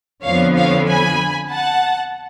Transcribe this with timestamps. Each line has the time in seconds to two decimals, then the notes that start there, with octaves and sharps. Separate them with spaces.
0.23 F2 D3 F3 B3 C#5 F5
0.55 C#5 F5
0.87 G#5 B5
1.50 F#5 A5